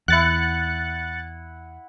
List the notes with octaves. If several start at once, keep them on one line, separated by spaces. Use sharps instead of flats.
E2 E4 F#5 F#6 A6 C#7